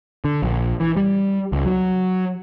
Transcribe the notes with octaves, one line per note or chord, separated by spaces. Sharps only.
D3
A#1
E3
G3
C#2
F#3